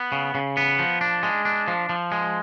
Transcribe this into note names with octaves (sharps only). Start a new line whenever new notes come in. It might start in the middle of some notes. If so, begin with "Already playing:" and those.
Already playing: B3
C#3
C#3
B3
F3
D4
G#3
D4
F3
F3
G#3